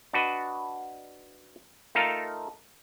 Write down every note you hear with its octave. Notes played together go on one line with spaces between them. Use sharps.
D4 F#4 B4 D#5
A3 D#4 F4 A4 A#4 F5